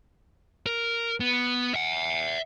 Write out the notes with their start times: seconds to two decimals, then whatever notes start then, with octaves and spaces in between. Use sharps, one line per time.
0.66 A#4
1.20 B3
1.75 E5 F#5